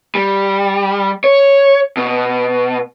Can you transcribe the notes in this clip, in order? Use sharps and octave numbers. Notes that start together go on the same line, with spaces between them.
G3
C#5
B2